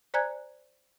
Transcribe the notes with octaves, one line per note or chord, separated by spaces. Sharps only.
C5 D5 G#5 A#5 F#6 G#6